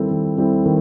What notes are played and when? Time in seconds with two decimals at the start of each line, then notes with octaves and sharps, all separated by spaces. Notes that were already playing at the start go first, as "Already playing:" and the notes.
Already playing: D#3 G3 C4 E4 A4
0.11 D#3
0.38 G3 C4 E4 A4
0.66 D#3